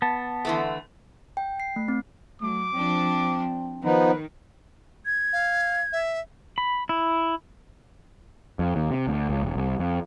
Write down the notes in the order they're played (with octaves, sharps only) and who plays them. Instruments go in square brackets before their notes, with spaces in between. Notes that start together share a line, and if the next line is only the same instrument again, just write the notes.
[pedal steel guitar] B3 [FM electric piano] A5
[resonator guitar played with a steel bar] D3 E3 A3
[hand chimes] G5
C7
A3
C4
[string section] F#3 [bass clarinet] A3 [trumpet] D6
[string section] F3 D4 [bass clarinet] C4
[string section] D#3 [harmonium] F3 B3 D#4 [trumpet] B4
[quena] G#6
[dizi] F5
E5
[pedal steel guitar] B5
E4
[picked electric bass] F2
D#2
C3
D2
C#2
E1
C2
F2